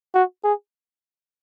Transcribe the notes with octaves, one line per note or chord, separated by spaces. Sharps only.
F#4
G#4